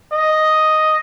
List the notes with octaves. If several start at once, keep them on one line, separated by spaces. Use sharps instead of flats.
D#5